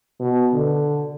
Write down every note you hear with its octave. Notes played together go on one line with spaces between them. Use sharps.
B2
D3